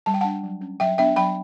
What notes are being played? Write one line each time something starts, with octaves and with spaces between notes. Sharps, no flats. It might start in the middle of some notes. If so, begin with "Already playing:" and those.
G3 A5
G5
D4 F#5 A5
F#3
C#4
F#3 E5 G5
B3 D4 E5 G5
F#3 G5 B5